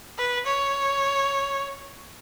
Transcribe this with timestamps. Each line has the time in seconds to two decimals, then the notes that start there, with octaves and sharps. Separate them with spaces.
0.18 B4
0.46 C#5